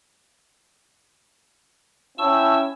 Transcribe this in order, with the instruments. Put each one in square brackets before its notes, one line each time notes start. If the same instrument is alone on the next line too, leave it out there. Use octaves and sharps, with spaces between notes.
[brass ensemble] C#4 E4 G5 [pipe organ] A5 C#6 E6